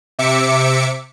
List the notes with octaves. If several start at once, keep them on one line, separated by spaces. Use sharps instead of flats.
C3 E5 D6 C#7